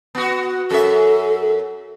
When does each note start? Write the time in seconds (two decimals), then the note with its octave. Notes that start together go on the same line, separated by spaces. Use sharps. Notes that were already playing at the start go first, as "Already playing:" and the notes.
0.15 B3 F#4
0.71 F#2 A4 E5